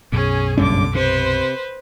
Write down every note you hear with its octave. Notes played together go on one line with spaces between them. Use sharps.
B1 F#2 B2 C#4 G#4
F#1 G2 D3 C#4 D6
C3 B4 C5